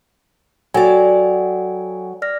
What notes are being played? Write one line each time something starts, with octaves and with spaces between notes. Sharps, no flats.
F#3 A4 D5 G5 G#5
D5 F6 A#6